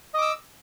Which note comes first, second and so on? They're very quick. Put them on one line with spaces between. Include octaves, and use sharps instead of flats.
D#5 D6 E6